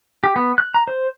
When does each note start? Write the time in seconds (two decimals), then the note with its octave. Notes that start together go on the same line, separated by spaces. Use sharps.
0.24 G4
0.36 B3
0.58 F#6
0.74 A#5
0.88 C5